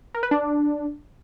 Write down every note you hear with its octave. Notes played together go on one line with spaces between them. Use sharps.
A#4
B4
D4